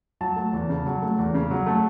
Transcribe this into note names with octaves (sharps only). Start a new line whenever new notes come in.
F#3 A5
A3
E2
C#3
F#3
A3
E2
C#3
F#3
A3